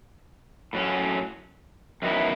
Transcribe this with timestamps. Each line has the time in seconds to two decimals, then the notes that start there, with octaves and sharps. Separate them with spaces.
0.73 A2 F#3 C#4
2.02 F#2 D#3 F#3 B3 E4